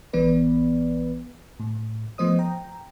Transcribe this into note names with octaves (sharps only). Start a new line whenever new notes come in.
A1 E3 B3 B4 D5
A2
F3 A3 B3 C5 D#5 D#6
G5 A#5